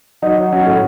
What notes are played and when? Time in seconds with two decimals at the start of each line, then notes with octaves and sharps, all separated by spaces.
0.22 F#3 D#4
0.38 F#3
0.52 F#3 C#4
0.67 A2